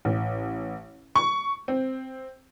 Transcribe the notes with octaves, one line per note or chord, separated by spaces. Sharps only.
A1
C#6
C4